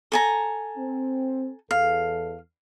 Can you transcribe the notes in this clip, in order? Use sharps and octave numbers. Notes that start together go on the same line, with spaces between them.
A4 G#5 A#5
C4
E2 A4 F5